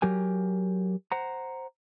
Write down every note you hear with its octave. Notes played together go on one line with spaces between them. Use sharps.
F#3 G4 A#4 G#5
C5 F#5 A#5